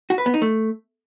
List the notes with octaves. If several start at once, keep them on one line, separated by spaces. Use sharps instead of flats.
F#4
B4
B3
D#4
A3